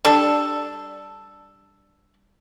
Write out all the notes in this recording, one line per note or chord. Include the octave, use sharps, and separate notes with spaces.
G3 D4 A4